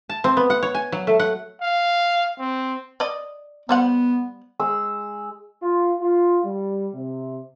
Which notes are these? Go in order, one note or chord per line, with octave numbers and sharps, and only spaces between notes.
A5
C4
B3
F#5
C#5
G#5
F#3
A3
F#5
F5
C4
D5 D#5
G3 B3 C5 F#5
G#3 E6
F4
F4
G3
C3